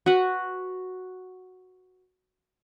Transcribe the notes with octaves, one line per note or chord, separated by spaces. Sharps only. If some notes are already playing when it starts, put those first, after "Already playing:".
F#4 B4 F#5